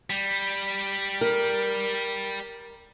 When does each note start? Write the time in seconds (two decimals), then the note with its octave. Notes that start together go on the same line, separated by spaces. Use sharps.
0.10 G3
1.21 A#4